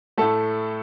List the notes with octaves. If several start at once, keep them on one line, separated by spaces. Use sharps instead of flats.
A2 A3 A4 A5